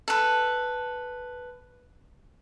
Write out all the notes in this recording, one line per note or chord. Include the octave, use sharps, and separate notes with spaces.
A4 B4